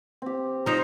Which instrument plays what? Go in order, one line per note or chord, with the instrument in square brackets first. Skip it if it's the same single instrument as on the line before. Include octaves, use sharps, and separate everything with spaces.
[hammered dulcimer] C4 G4
[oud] F3 D#4 [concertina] C5 A#5